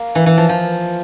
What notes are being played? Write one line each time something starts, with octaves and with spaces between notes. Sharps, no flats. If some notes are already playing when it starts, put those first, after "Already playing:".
Already playing: A#3
E3
E3
F3
F3